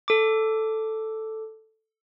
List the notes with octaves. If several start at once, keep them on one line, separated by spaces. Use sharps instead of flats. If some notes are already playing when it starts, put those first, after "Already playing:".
A4 D6